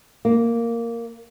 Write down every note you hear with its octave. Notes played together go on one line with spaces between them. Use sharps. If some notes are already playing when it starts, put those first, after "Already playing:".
A#3